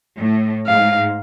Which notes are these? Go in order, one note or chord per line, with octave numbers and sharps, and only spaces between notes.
A2
G#2 F5